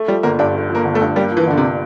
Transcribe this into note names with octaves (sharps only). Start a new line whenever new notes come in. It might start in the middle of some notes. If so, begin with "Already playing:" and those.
Already playing: A3
F3 G3
G1 A#3
G2 D4
A3
F3
A#3
G1
A3
G2
G3 A#3
F3
E3
G1 D3
C3